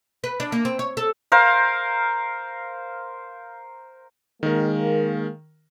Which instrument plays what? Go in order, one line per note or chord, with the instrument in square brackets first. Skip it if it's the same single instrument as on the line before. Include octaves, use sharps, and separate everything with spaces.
[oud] B4
D4
A#3
C4
C#5
A4
[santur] A#4 C5 F5
[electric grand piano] D#3 A#4 [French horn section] G#3 A#3